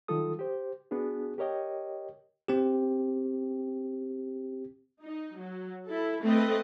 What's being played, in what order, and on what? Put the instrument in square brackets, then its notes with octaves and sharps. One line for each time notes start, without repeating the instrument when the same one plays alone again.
[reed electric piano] D#3 F#3 G3 F4 A4 D#6
G4 C5
B3 D4 F#4 G#4
G4 A#4 C#5 D#5 G5
[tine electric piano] C4 G4
[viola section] D#4
F#3
E4 A4
A3 C4 A4 B4 D#5